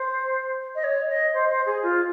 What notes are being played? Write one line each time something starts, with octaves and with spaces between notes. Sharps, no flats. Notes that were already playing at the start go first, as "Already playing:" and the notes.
Already playing: C5
D#5
C#5
D#5
C5
C5
G#4
F4